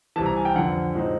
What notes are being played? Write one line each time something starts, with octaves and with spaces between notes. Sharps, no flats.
C2 C3 E3 A5
A#5
G#5
G5
F2 D3 F3 F#5
A2 F3 G#3 C4 D#4